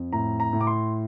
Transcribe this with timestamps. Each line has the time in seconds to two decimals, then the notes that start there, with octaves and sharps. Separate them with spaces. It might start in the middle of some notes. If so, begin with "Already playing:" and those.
Already playing: F2
0.12 A2 A#5
0.40 A#5
0.53 A2
0.61 D6
0.67 C6